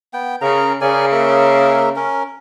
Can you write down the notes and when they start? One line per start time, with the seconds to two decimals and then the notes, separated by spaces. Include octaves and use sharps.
0.14 B3 G5
0.41 C#3 A#4 A#5
0.81 C#3 A#4 D5 G#5
1.12 A#3 A#4 E5
1.96 C#4 A#4